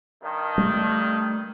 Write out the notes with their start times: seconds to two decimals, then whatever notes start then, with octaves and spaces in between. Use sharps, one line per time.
0.22 G2 D#3
0.58 G3 A3